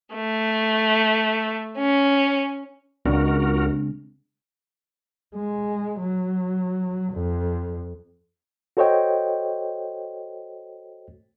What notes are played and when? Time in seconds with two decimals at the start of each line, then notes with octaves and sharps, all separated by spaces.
0.14 A3
1.78 C#4
3.06 C#2 C#3 G#3 C4 D4 F#4 A#4
5.35 G#3
6.00 F#3
7.14 F2
8.77 F#4 A4 C5 C#5 D#5 G5